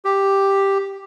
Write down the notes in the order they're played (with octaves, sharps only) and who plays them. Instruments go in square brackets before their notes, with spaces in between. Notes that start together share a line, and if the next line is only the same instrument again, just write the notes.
[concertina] G4